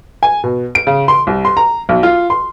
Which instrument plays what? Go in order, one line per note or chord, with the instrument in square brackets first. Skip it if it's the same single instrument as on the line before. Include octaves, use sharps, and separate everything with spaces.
[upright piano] G#5
B2
D7
C#3
C6
C2
C6
A#5
B1
F4
C6